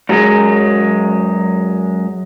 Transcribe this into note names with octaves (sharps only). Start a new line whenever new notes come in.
F#2 F#3 G#3